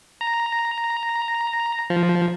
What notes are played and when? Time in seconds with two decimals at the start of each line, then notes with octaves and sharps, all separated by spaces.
0.21 A#5
1.90 F3